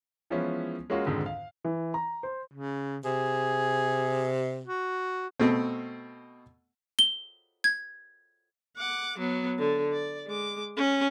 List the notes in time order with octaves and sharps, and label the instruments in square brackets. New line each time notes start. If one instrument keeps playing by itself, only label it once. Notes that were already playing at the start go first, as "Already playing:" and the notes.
[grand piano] E3 F3 G#3 B3 C#4 E4
G#3 A#3 C#4 F4 F#4
F2 G#2 D3 D#3 G#3
F5
[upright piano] E3
A#5
C5
[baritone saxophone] C#3
[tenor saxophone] C3 [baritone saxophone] G#4
[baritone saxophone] F#4
[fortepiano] B2 A3 C4
[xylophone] G7
G#6
[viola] F#5 D6
F#3 B3
D3
D5
G#3 D6
C#4